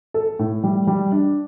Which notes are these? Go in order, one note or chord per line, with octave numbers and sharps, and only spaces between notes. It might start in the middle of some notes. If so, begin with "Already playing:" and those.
A4
A2
G3
G3
D4